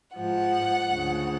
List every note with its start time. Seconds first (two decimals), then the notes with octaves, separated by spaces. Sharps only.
0.16 G#2 F3 F#5
0.91 D2 C#3 F3